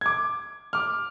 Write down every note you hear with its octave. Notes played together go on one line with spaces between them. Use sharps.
D6 G#6
D6 F6